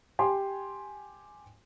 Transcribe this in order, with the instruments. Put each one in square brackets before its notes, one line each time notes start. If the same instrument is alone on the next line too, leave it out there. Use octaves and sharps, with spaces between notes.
[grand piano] G4 G#5 C6